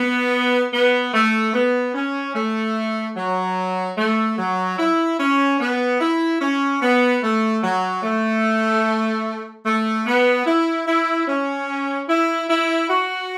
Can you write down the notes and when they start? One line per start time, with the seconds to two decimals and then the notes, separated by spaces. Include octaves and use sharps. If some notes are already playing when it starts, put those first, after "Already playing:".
Already playing: B3
0.73 B3
1.14 A3
1.54 B3
1.94 C#4
2.35 A3
3.16 F#3
3.98 A3
4.38 F#3
4.78 E4
5.20 C#4
5.60 B3
6.00 E4
6.41 C#4
6.82 B3
7.23 A3
7.63 F#3
8.03 A3
9.66 A3
10.06 B3
10.46 E4
10.88 E4
11.28 C#4
12.09 E4
12.50 E4
12.90 F#4